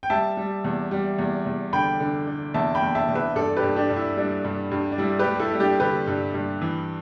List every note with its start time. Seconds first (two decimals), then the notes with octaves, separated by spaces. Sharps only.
0.03 G5
0.10 G3 E5 A5
0.37 G3
0.64 E2
0.91 G3
1.19 E2
1.46 E2
1.73 D3 G5 B5
2.00 D3
2.27 D3
2.54 E2 E5 A5
2.75 G5 B5
2.82 E2
2.95 E5 A5
3.09 E2
3.15 B4 E5
3.36 G2 A4 D5
3.57 G4 B4
3.63 G2
3.76 D4 G4
3.90 G2
3.96 E4
4.17 G3 D4
4.44 G2
4.72 G2
4.92 D4
4.98 G3 E4
5.19 G4 B4
5.26 G3
5.39 E4 A4
5.53 G3
5.59 D4 G4
5.80 D3 G4 B4
6.07 G2
6.34 G2
6.62 E3